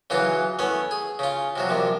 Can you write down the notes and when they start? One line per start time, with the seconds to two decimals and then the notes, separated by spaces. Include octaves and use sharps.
0.10 C#3 E3 F#3 F4
0.59 A3 B3 C#4 E4
0.91 G#4
1.19 C#3 F4
1.56 C3 F3 F#3
1.69 A#1 C3 F3